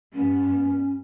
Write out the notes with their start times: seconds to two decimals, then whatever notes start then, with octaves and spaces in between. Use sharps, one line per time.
0.13 G2 B3 C#4